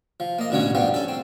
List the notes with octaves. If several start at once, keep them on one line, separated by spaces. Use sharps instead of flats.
F3
A#3 D#5
A1 B2 D3 F#3 C#4 C#5
G2 F3 G3 B3
C#4 A4
C4